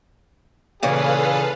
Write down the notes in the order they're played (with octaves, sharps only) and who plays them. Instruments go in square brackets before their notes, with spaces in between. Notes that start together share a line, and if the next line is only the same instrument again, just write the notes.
[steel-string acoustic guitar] A#2 C#3 E3 [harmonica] G#4 [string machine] A4 B4 F5